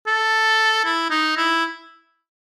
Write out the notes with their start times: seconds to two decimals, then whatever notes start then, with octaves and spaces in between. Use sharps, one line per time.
0.07 A4
0.85 E4
1.10 D#4
1.37 E4